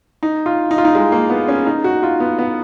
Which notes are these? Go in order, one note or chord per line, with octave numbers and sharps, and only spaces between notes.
D#4
F4
D#4
F4
D#4
G#3
A#3
B3
C#4
D#4
F#4
F4
B3
B3